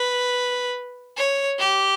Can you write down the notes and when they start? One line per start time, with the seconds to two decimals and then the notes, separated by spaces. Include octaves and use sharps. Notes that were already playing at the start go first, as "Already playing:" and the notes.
Already playing: B4
1.17 C#5
1.59 G4